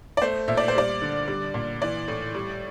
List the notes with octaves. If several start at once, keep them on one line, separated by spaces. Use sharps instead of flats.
D5
A3 C5
A#2 E5
D5
C5
G3 D5
D3
G3
A#2
E3 D5
A2
G3